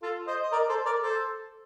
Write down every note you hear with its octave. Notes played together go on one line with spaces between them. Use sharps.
F4 A4
C5 D#5
D#5
A#4 D5
A4 C5
A#4 D5
A4 C5